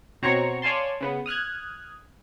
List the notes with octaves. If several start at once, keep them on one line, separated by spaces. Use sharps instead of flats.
B2 C4 F#4 C#5 A#5 C#6
C#5 D5 F5 G#5 A5 C6
C#3 B3
D#6 F6 F#6 G#6